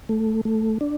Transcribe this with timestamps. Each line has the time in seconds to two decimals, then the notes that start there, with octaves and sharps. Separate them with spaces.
0.09 A3
0.45 A3
0.81 D4